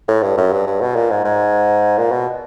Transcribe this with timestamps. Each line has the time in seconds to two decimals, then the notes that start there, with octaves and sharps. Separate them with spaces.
0.08 A2
0.23 G2
0.37 F#2
0.52 G2
0.67 G2
0.81 B2
0.96 A#2
1.10 G#2
1.25 G#2
1.98 A#2
2.11 B2